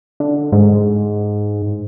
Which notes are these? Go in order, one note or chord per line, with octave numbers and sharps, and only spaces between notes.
D3
G#2